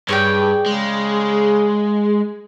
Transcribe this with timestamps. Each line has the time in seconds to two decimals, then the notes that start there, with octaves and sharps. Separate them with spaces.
0.09 G2 G#4 C#5 D5 G5
0.66 C#3 G#3